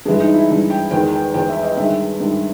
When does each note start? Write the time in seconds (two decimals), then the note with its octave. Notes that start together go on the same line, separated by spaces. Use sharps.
0.05 G2 G#4
0.08 E3 G#3
0.20 D#4
0.34 E4
0.48 G2 E3 G#3
0.70 G5
0.91 E2 D#3 G#3 G5
1.13 G5
1.34 E2 D#3 G#3 G5
1.49 E5
1.63 D#5
1.77 G2 D#3 G#3 E5
2.20 G2 D#3 G#3